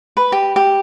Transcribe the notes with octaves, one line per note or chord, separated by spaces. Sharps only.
B4
G4
G4